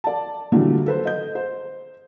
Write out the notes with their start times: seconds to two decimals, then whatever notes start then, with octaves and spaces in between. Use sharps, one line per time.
0.04 D5 A5
0.52 A#2 D3 E3 F#3 G3 A3
0.86 A4 B4 C5
1.05 D#5 G6
1.35 C5